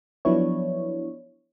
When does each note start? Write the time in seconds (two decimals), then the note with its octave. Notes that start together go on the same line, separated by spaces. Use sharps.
0.25 F3 F#3 B3 D4 E4 C#5